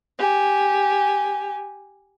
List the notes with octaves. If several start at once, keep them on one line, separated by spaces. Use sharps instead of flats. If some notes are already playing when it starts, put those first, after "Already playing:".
G4 G#5